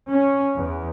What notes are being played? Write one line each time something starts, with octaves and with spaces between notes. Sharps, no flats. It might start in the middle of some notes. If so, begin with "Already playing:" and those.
C#4
E2